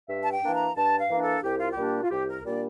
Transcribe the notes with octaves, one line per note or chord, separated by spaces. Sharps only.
G2 E5
A5
G5
E3 A#3 D4
A#5
G2 A5
F5
E3 A#3 D4
A4
C2 G4
F4
G4
A#2 G3 A#3 D4
F4
C2 G4
A#4
A#2 G3 A#3 D4 D5